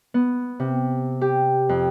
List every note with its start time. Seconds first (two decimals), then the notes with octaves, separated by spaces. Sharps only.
0.14 B3
0.60 C3
1.21 G4
1.69 F2